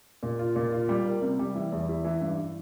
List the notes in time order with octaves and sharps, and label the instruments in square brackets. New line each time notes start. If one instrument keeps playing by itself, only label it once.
[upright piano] A#2
F4
A#2
F4
G3
A#3
C3
G3
E3
E2
E4
E3
G2